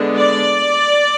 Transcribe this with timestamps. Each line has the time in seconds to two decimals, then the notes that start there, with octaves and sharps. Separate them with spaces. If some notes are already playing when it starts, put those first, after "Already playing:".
Already playing: D3 G#3 B3 D4
0.17 D5